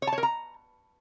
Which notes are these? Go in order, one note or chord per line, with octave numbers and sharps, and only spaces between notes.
C#5
A5
C#5
A#4
A#5